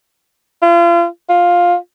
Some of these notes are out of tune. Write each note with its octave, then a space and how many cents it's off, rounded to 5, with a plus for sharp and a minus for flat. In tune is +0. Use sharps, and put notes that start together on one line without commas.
F4 -35
F4 +10